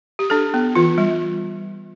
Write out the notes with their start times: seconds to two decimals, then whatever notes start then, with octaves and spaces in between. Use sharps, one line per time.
0.19 G4
0.30 D4 A4
0.54 B3
0.75 E3 F4
0.98 G3